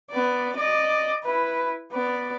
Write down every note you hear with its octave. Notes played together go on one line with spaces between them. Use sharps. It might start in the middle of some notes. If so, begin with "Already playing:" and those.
B3 D5
D5 D#5
E4 B4
B3 D5